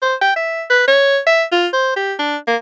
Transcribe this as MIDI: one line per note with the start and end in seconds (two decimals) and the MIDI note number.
0.02 0.15 72
0.21 0.35 79
0.36 0.64 76
0.70 0.88 71
0.88 1.19 73
1.26 1.44 76
1.52 1.67 65
1.73 1.91 72
1.96 2.14 67
2.19 2.37 62
2.47 2.56 58